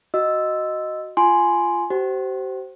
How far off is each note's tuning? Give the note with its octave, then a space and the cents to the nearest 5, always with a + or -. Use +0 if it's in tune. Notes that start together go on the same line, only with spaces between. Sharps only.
F#4 +0 D#5 +0 E6 +0
F4 -10 G#5 +10 C6 +0
G4 -40 C5 -5